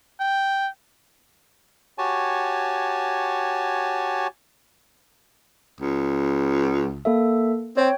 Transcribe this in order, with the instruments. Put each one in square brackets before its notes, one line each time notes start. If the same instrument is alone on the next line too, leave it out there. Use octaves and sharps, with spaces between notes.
[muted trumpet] G5
[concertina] F#4 G4 C#5 G#5 A5
[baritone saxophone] C#2
[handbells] A#3 A4 E5
[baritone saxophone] C4 [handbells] C#5 G5